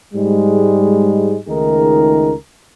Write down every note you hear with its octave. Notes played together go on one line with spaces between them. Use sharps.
G#2 G3 G#3
C#2 D#3 A3 D#4 G#4 A#4